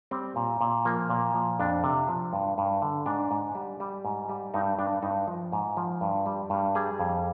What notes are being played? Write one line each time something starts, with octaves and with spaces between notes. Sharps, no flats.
G3 C4
A#2
A#2
F3 A#3
A#2
F3
F2 D4
C3
F3
G2
G2
D3
G#2 D4
G#2
G3
G3
G#2
G3
G2 D#4
G2 D4
G2 D#4
F3
G#2
F3
G2
G3
G2
G3 G#4
F2